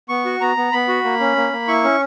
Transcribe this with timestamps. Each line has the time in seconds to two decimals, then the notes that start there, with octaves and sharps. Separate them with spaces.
0.09 B3 C#6
0.25 F#4
0.41 B3 A#5
0.57 B3
0.72 B3 B5
0.88 F#4
1.04 A#3
1.20 C#4
1.36 A#3
1.53 A#3
1.68 E4 C#6
1.84 C#4